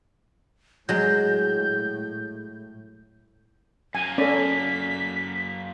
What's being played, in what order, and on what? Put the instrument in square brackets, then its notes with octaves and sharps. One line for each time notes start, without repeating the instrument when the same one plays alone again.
[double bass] A2 [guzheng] F#3 G#3 [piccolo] G6
[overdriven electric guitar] F#2 A#3 [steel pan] G#5
[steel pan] C#4 [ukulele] A4 D5 [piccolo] B6